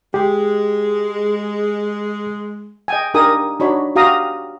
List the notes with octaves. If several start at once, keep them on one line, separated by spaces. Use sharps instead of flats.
G#3 G4
D#5 G5 G#5
D4 D#4 G4 A#4 G#5 D#6
D4 D#4 F#4 C#5 B5
F#4 G4 F5 A#5 D#6